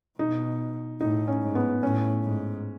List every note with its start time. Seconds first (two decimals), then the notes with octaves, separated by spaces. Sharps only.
0.19 B2 D#4
1.01 A2 D#4
1.28 C#4
1.42 G#2
1.55 B3
1.83 A2 C#4
2.24 G#2